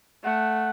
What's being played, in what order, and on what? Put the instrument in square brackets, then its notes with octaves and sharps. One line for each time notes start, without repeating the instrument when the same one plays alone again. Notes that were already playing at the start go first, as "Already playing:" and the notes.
[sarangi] A3 [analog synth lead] F#5